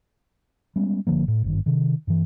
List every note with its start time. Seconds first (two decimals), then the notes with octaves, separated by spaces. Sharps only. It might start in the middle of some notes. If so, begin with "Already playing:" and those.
0.76 G3 G#3 B3 C#4
1.07 G1 D3 F3 A#3
1.28 A2
1.44 G#1 G2 D#3
1.66 C3 D#3
2.07 G2 E3